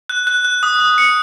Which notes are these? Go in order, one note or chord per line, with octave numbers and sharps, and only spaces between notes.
F#6
F#6
F#6
D#6
D#6
C#7